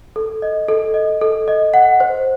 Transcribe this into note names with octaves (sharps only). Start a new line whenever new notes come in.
A4
D#5
A4
D#5
A4
D#5
F#5
C5